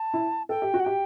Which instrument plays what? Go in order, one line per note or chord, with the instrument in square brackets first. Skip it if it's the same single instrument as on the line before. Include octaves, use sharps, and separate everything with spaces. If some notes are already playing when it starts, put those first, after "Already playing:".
Already playing: [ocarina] A5
[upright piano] E4
[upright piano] A4 [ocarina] G5
[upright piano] G4
F#4
[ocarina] F#5
[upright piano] G4 [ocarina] G5